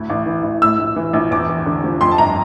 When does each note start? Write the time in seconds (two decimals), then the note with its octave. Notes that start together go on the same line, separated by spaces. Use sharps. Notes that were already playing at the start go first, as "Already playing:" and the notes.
Already playing: D2 A2
0.10 A1
0.26 E3
0.43 A1
0.62 A2 E6
0.79 A#1
0.96 E3
1.13 A#1
1.31 E2 D6
1.48 E1
1.66 D3
1.84 F3
2.01 F2 C6
2.11 A5
2.18 G1 A#5